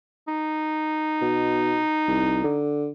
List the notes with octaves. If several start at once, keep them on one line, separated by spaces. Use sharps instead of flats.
D#4
B2
C2
D3